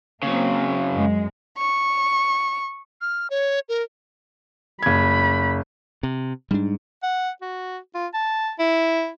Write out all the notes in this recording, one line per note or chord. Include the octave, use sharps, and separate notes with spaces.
C#3 F#3 A#3 C4
F#2 G#3
C#6
F6
C#5
A#4
F#1 B5 G#6
C3
G#2 G3 D4
F#5
F#4
F4
A5
E4